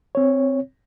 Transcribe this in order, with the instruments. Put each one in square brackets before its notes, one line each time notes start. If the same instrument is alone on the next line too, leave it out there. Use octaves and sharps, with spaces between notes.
[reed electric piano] C4 C#5